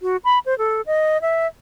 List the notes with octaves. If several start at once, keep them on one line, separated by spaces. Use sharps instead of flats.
F#4
B5
C5
A4
D#5
E5